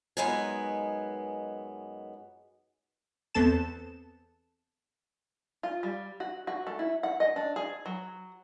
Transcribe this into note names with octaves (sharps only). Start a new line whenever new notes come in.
F#2 G#3 B3 D#4 B4 G#5
E2 B3 C4 A4 A5 E7
F4
G3
F#4
F#4
A3
E4
F#5
D#5
D4
G#4
F#3